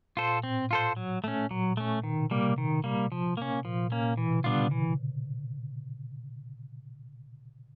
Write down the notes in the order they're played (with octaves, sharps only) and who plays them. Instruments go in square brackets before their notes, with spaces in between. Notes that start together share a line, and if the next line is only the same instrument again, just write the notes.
[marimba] A#2 [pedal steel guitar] F4 A4 C5
[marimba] A2 [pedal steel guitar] C4
[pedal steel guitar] F4 A4 C5
F#3
A3 C#4
[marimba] A#2 [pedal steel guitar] F#3
[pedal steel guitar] A3 C#4
[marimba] B2 [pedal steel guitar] D#3
[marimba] C3
[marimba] C3 [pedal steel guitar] G3 A#3
[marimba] C3
[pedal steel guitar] D#3
G3 A#3
F3
A#3 C#4
[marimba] A#2 [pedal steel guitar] F3
[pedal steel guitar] A#3 C#4
[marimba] A#2
[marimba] B2 [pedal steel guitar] E3
[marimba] C#3
[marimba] D3 [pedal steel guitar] G3 B3 D4 F4
[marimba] C#3
[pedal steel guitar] E3